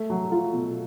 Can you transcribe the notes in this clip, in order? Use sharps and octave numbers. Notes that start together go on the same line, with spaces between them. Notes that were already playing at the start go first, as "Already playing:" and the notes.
Already playing: A3
F#3
F4
B2